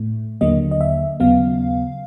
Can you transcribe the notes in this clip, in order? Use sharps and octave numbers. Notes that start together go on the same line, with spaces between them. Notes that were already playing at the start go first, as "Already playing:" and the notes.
Already playing: A2 A3
D#2 D3 F#3 A#3 D#5
D#5
E5
D#2 C#3 F#3 B3 F5